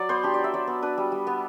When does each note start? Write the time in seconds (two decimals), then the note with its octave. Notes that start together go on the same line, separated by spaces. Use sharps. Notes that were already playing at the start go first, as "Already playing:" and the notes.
Already playing: F#3 D5
0.09 B3 C5
0.23 D4 G4
0.34 F#3 D5
0.44 E5
0.54 F#3 D5
0.67 B3
0.83 D4 B4
0.98 G3
1.12 G3
1.27 B3